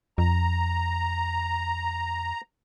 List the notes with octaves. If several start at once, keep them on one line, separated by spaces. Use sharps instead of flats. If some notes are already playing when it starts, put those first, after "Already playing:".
F2 A#5